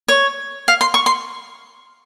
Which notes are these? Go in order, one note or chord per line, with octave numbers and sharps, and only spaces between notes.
C#5
F5
C6
C#6
C6